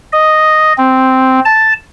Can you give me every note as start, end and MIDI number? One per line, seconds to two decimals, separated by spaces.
0.12 0.73 75
0.78 1.40 60
1.45 1.73 81